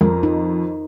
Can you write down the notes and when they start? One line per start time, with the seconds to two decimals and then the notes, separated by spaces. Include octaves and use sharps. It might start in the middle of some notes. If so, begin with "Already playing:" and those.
0.01 F2 A#4
0.23 D#4